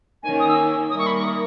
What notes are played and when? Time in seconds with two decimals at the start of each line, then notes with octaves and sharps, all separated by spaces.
0.23 D#3 A#3 C#4 G#5
0.40 D#6
0.48 E6
0.90 D#3 G3 A#3 E4 A#4 D#6
0.99 C#6
1.07 B5
1.16 C#6
1.24 D#6